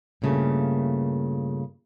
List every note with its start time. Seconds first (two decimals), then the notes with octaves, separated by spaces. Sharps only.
0.22 G2 A#2 C#3 A3 A#3